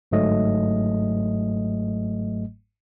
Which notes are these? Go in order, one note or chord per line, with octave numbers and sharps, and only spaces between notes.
G1 G#2 F#3 A3 D#5